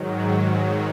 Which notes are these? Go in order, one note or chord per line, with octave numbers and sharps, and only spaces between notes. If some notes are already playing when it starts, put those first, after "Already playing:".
Already playing: G#2 D#3 F#3